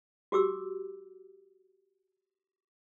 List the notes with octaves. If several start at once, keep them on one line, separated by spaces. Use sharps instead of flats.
F#4 G4 D6 E6